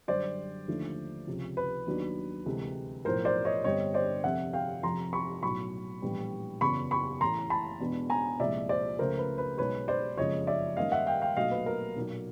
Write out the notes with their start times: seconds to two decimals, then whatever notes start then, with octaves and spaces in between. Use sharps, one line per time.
0.08 F#2 D3 G3 C5 D5
0.68 D#2 D3 F3 A3 D4
1.27 C#2 C3 F3
1.57 B4
1.86 D#2 D#3 F#3 B3 D4
2.46 D2 C3 E3 G#3
3.05 B1 A2 F3 A#4 C5
3.25 C5 D5
3.45 C#5 D#5
3.64 G1 G2 D3 G3 C4 C#5 D#5
3.94 C5 D5
4.24 F1 F2 C3 E5 F#5
4.53 F5 G5
4.83 F2 C3 F3 A#5 C6
5.13 B5 C#6
5.42 B1 A2 F#3 B5 C#6
6.02 A#1 A2 E3 G3 B3
6.61 F#1 E2 C#3 F#3 B3 B5 C#6
6.91 B5 C#6
7.21 A1 A2 E3 A#5 C6
7.50 A5 B5
7.80 E2 B2 G#3 B3 D4
8.10 G#5 A#5
8.40 C2 A#2 F3 G#3 D5 E5
8.69 C5 D5
8.99 C#2 C#3 F3 A3 A#4 C5
9.18 B4
9.38 B4
9.58 B1 B2 G#3 B3 B4 C#5
9.88 C5 D5
10.17 F#1 F2 C#3 F3 G#3 C#5 D#5
10.47 D5 E5
10.77 G#2 D#3 G3 A#3 C#4 D#5 F5
10.92 E5 F#5
11.07 F5 G5
11.22 F5 G5
11.37 B1 A#2 F#3 A3 D#5 F5
11.51 B4
11.66 A#4
11.96 B1 A#2 F#3 A#3